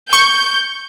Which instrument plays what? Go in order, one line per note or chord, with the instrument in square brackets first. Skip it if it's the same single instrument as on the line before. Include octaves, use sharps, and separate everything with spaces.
[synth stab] C#6 [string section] G6